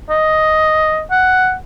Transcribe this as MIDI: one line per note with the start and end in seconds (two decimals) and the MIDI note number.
0.10 1.02 75
1.11 1.54 78